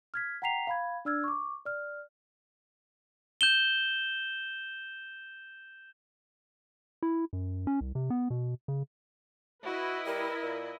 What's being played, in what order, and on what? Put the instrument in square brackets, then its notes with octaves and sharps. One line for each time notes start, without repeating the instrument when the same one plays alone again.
[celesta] F6 G#6 B6
F#5 G5 A#5 B6 C7 F7
F5 B5 G#6
D4 D5 E6 F6 G#6
C#6 D6
D5 F6
[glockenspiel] G6 E7 G7
[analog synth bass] E4
F#2
C#4
C2
C3
B3
B2
C#3
[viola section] E4 B4 D#5 [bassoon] F#4
[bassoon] G3 [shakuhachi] A#4
[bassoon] A#2